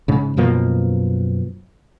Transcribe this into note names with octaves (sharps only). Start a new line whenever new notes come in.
G#2 C#3
F#2 B2 F3 A#3